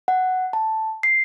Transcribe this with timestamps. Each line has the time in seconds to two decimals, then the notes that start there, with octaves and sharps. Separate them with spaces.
0.08 F#5
0.53 A5
1.03 C7